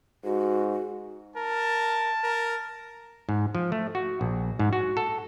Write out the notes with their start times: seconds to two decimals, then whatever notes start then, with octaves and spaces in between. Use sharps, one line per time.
0.25 G#2 F#4
1.36 A#4 A5
2.24 A#4
3.29 G#2
3.55 F3
3.72 A3
3.95 F#4
4.21 A#1
4.59 G#2
4.73 F#4
4.97 A4